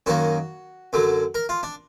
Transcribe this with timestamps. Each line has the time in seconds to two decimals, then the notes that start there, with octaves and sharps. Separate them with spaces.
0.06 F#2 D#3 A#3 F#4
0.93 F#2 D3 F#3
1.35 A#4
1.49 F4
1.63 D4